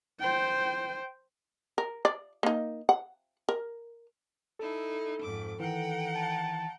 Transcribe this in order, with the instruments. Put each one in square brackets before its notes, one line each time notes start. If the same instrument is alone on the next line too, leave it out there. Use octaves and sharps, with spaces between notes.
[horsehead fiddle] C5 G5
[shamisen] A#4
D5
A#3 D#4
F#5
A#4
[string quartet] D#4 E4 [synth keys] A4
[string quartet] F2 G#2 D6
[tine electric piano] D#3 E3 [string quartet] F#5 G5 A#5
[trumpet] A5